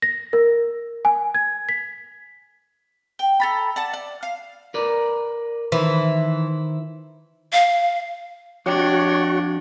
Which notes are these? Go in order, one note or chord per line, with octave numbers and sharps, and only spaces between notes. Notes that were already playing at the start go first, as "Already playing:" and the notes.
A#6
A#4
G#5
G#6
B6
G5
A4 A#5 B5
D5 F#5 A5
D5
F5
A#4 B4 D5
D#3 E3 E4 C5
F5
F2 D4 F#4 G4 C#5